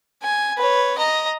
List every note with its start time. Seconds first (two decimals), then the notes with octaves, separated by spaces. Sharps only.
0.23 G#5
0.57 B4 C#5
0.98 D#5 A#5